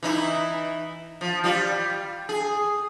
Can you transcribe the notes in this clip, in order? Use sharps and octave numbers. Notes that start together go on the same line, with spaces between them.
E3 D#4 E4
F3
G3 F4
G#4